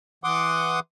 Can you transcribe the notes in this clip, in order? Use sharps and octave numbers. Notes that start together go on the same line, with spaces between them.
E3 F#5 C6 D6 D#6